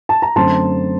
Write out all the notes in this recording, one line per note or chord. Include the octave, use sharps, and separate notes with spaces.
A5
A#5
F#2 D3 A3 C4 A5 C6